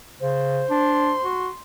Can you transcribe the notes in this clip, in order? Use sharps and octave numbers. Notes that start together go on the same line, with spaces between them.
C#3 C5
D4 C6
F#4